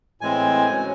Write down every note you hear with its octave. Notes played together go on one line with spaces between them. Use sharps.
A2 E3 G#3 C4 G#5
C#3 F#3 C#4